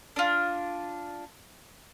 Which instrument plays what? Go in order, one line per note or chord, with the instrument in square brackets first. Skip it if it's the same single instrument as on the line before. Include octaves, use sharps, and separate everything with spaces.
[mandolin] D4 F4